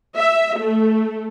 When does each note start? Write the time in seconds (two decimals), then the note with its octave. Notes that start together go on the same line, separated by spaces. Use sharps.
0.16 E5
0.57 A3